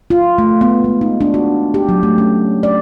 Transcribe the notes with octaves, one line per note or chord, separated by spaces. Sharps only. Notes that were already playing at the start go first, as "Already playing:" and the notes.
F4
A3
B3
G#3
D#4
D4
F#4
G4
F#3
A3
C#4
D5